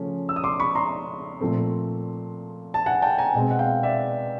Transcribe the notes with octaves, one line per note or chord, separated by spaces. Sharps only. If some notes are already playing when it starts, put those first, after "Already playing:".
Already playing: C#3 F3 A3 C#4
E6
D#6
C6 D6
B5 C#6
A#5 C6
A#2 F3 A3 C4
A5
F#5 G#5
G5 A5
G#5 A#5
B2 G#3 C4
F#5
F5 G5
D5 E5